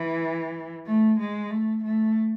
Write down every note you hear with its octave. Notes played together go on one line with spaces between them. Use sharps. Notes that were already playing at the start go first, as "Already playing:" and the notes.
Already playing: E3
A3
G#3
A3
A3